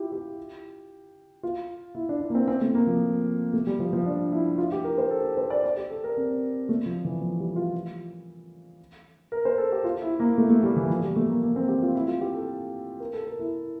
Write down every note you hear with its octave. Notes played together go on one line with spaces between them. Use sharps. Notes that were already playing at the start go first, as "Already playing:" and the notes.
Already playing: E4 F4 G4
G4
F4
E4
D4
D4
A#3
C4
C4
A3
A#3
F3
A3
G3
F3
F3
D4
E4
F4
G4
A#4
C5
A4
A4
C5
D5
D5
G4
A4
A#4
C4
A3
F3
E3
F3
G3
F4
A#4
C5
A4
G4
F4
E4
A#3
A3
A3
G3
E3
F3
G3
A3
A#3
A#3
C4
G4
F4
E4
F4
G4
A4
A#4
A4
A#4
E4